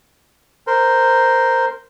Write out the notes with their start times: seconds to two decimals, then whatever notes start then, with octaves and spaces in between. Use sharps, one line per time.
0.67 A#4 C5